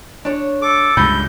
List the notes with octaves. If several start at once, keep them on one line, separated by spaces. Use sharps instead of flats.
D4 C#5
A4 D6
C#2 G2 B5 G6